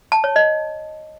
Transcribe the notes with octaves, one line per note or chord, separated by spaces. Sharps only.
A5
C#5
D#5